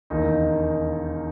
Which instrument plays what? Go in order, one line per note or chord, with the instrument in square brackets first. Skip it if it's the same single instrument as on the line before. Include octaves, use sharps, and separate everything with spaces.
[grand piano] E1 D#2 D#3 A#3 D#4